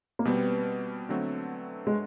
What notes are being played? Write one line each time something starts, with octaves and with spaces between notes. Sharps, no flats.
A#3
B2 G3 B3 C4
D3 F#3 A3 C4
G#3